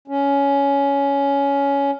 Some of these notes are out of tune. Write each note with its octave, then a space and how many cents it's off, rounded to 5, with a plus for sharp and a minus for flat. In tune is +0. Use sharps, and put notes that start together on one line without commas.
C#4 +15